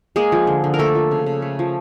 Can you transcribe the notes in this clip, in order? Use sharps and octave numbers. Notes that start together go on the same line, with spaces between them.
G#3 A#3 G#4
F3
D3
D3
A#4
A3 A#3 A4
F3
C#3
C#3
A3
F3